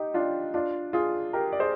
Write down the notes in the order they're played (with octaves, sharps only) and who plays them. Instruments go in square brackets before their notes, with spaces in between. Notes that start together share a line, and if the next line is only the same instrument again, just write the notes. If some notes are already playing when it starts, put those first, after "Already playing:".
Already playing: [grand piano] D#4 G4
D4 F4
D4 F4
F4 G#4
G4 A#4
D5
G#4 C5